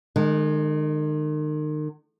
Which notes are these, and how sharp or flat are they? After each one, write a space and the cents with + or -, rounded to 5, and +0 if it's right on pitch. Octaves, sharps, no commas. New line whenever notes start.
D#3 -40 G#3 +5